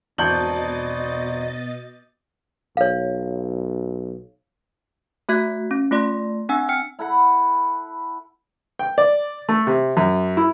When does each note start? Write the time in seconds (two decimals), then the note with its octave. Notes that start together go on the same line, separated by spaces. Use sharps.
0.18 G#1 E2 B2 D4 D#5 G6 A6 F#7
2.77 B1 C#5 F5
5.29 A3 F#4 E5 F#6 G#6 B6
5.71 C#4
5.91 A3 F4 D5 C6 A#6
6.49 C4 D4 F#5 G#5 E6
6.69 G5 F6 C#7
6.99 E4 A4 F#5 B5
8.79 G5
8.98 D5
9.49 A3
9.67 C3
9.97 F#2
10.37 E4